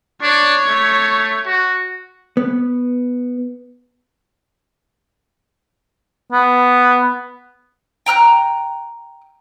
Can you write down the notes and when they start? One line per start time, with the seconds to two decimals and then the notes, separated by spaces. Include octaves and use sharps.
0.22 D4 C#5
0.67 A3
1.46 F#4
2.37 B3
6.33 B3
8.06 G5 A#5 F6 F#6